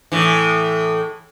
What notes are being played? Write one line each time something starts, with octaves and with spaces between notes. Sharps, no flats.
A2 E3